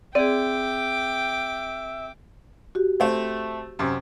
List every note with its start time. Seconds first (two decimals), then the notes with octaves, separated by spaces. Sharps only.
0.15 C4 G#4 D5 E5 G5 D6
2.75 F#4 G4
3.00 A3 C4
3.79 F#2 C3